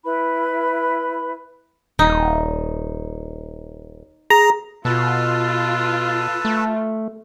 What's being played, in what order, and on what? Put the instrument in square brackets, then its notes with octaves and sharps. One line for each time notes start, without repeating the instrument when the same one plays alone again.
[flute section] E4 B4 B5
[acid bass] D#1 [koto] D#4
[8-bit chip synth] G#4 [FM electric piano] A#5
[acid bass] B2 [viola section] F4 [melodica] A4 B4 A5
[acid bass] A3